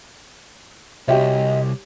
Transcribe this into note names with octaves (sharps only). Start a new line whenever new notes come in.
C2 F#4 G4 C#5 D#5 E5 G5 G#5